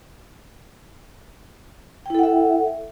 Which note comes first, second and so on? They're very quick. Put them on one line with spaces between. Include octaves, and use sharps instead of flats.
G5 E4 A4 F#5 E5